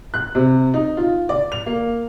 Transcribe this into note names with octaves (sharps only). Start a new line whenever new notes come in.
F#6
C3
D#4
F4
D5
F7
A#3